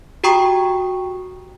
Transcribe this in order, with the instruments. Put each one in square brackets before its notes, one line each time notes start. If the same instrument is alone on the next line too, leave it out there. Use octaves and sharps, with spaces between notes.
[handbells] F#4 G4 G5 A#5 C#6 D#6